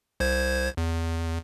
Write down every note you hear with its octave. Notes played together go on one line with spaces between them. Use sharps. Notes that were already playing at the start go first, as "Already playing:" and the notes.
C2 C5 G#6
E2